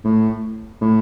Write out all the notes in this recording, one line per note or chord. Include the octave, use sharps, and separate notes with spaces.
A2
A2